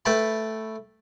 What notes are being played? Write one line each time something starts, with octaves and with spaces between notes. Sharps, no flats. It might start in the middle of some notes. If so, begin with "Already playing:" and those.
A3 B4 G5 A5 B5